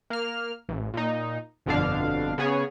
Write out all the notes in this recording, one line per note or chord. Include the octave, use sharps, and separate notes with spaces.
A#3 F6
A1
A#2 D#4
G1 F2 B2 D3 D4 F5
C#3 B3 G#4 C#5